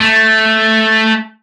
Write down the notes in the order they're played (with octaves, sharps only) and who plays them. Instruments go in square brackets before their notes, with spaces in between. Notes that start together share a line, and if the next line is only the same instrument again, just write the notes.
[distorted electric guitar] A3